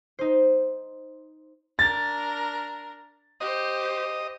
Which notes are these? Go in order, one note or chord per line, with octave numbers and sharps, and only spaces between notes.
D#4 C5
D4 A#4 A6
G4 C5 D#5